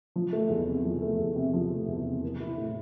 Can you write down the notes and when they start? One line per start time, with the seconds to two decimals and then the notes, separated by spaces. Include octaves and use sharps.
0.16 F3
0.33 A3
0.50 E2
0.67 C3
0.85 F3
1.02 A3
1.19 E2
1.36 C3
1.53 F3
1.71 A3
1.88 E2
2.05 C3
2.23 A#3
2.40 E4
2.58 A2